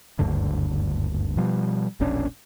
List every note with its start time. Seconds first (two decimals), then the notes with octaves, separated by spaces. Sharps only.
0.19 F#1 D2 G2 D3
1.37 B2 F3 G3
2.00 E1 A#1 C#4 D4